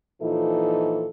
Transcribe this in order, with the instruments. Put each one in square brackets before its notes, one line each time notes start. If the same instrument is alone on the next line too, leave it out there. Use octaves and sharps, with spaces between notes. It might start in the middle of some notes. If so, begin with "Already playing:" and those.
[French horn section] A#2 E3 F3 D#4 A4